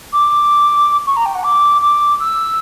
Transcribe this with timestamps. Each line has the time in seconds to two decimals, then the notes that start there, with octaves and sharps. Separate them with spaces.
0.12 D6
1.06 C#6
1.16 A#5
1.25 G5
1.34 F#5
1.43 D6
1.81 D6
2.19 E6